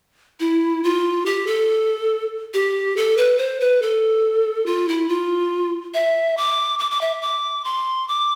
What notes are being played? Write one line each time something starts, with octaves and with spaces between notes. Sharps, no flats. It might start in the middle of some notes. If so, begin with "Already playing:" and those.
E4
F4
G4
A4
G4
A4
B4
C5
B4
A4
F4
E4
F4
E5
D6
D6
D6
E5
D6
C6
D6